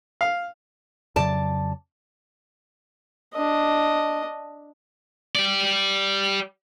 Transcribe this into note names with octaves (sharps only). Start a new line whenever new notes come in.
F5
F2 C#3 F#3 D5 A5
D4 D#5
G4 D5